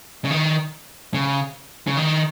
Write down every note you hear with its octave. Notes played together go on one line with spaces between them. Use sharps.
C#3
D#3
C#3
C#3
D#3